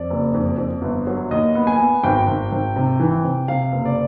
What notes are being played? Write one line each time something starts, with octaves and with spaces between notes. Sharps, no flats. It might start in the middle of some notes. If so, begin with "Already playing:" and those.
Already playing: F2 D5
F#1
F2
F2
G1
F#3
D#2 D#5
B3
G#5
B3
G#1 G5
G#1
G#1
C3
E3
C3
C3 F5
F#1
D5